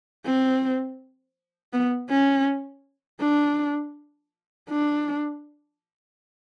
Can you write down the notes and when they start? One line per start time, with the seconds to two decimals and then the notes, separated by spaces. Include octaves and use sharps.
0.26 C4
1.73 B3
2.10 C#4
3.21 D4
4.70 D4